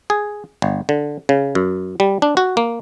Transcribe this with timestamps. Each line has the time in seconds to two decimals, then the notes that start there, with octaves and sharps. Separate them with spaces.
0.10 G#4
0.62 G1
0.89 D3
1.29 C#3
1.55 F#2
2.00 G3
2.22 D4
2.37 F#4
2.57 A#3